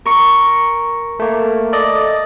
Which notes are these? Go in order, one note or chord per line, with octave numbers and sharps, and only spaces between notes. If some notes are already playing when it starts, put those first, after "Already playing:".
A#4 C#6
A3 A#3
A4 D5 D#5